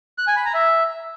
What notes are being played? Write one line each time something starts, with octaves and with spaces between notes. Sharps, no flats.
F#6
G#5
B5
A#5
E5